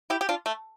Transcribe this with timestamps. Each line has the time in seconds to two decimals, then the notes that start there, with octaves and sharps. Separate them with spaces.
0.10 E4 G4
0.21 G4
0.29 D4 F4
0.46 A3